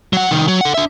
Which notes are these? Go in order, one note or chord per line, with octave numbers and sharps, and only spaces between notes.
F#3 F#5
C2 D#3
F#3
A4 F#5
D4 E5